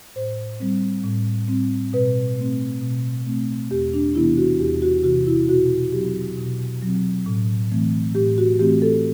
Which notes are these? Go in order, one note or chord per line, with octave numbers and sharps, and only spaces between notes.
A2 C5
G3 C4
A2
G3 C4
B2 B4
A3 C4
B2
A3 C4
E2 G4
D4
C3 E3 B3 E4
F#4
E2 G4
F#4
C3 E3 B3 F#4
E4
B2 F#4
F#3 C4 G4
B2
F#3 C4
A2
E3 A3 C4
A2 G4
F#4
E3 A3 C4 G4
A4